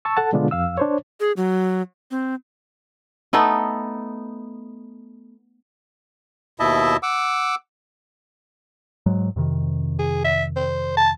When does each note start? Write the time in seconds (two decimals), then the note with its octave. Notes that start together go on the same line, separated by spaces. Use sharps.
0.05 A5 C#6 E6
0.17 A4 F#5 A5
0.33 B2 D3 G#3 B3 D4 F4
0.51 F2 F5 E6
0.78 D4 C5 C#5
1.20 G#4
1.37 F#3
2.11 C4
3.33 A3 B3 D#4 A4
6.60 D#2 B2 E4 D#5 E5 A5
7.03 F#5 D6 E6
9.06 G#2 F#3 G#3
9.36 F2 C3 D#3
9.99 G#4
10.24 E5
10.56 C5
10.97 A5